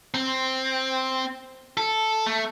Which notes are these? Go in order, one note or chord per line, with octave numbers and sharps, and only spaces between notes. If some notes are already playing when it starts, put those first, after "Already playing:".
C4
A4
A3